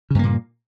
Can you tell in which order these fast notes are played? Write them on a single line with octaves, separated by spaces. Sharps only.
C#3 G2 A#3 A#2